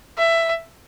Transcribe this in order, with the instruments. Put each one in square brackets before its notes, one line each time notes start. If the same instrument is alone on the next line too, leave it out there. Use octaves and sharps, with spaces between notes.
[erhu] E5